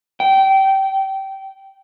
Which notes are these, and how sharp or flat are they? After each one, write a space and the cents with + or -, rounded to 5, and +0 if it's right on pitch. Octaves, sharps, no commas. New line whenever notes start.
G5 -20